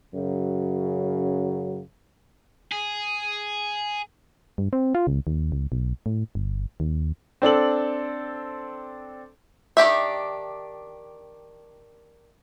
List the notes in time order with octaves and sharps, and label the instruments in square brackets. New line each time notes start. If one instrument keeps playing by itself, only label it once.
[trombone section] F#2 C#3 F#3
[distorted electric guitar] G#4
[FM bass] G2
C4
F4
C#2
D#2
C#2
B1
A2
G1
D#2
[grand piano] C4 D4 A4 F#7
[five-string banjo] D#3 D4 G4 E5